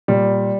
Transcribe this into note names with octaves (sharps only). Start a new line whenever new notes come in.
A#2 G3